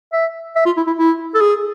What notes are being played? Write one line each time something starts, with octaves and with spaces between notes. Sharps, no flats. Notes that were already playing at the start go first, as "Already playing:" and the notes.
E5
E5
F4
E4
E4
E4
A4
G#4